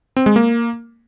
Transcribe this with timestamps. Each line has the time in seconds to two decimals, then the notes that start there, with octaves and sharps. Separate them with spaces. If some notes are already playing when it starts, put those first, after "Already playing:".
0.16 C4
0.26 G#3
0.36 A#3